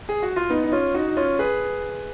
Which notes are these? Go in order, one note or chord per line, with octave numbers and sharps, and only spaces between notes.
G#4
F#4
F4
B3 D#4
D#4
C#4 F4
D#4 F#4
D#4
C#4 F4
G#4 B4